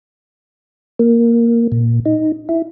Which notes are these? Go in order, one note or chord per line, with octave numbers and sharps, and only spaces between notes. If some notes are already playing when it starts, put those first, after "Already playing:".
A#3
A#2
D#4
E4